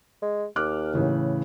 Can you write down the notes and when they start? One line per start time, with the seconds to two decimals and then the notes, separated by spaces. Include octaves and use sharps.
0.22 G#3
0.56 D#2 D6 F6 F#6
0.94 A2 C#3 E3